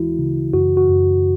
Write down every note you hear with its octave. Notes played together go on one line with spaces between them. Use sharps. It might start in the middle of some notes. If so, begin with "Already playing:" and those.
Already playing: D2 E3 G#3 E4 F#4
C#3
F#2 F#4
F#4
F#2